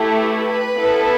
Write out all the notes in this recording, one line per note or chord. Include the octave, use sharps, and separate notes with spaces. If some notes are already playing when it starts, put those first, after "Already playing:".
Already playing: A3 E4 G4
B4
B3 E4 A4